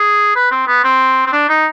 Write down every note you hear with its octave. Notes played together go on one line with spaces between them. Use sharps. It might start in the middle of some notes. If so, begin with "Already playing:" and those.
Already playing: G#4
B4
C4
B3
C4
C4
D4
D#4